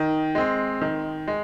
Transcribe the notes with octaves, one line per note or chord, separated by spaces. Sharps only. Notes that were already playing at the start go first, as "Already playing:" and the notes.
Already playing: D#3
G#3 C4
D#3
G#3